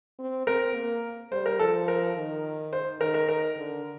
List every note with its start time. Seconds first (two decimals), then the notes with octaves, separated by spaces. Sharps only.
0.19 C4
0.47 C4 A#4
0.75 A#3
1.32 G3 C5
1.46 A#4
1.59 F3 A4
1.88 A#4
2.16 D#3
2.73 C5
3.01 D#3 A#4
3.14 A#4
3.28 A#4
3.57 D3